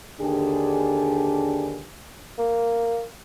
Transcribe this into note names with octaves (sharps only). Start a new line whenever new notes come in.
D#2 D3 D4 G4 G#4
A#3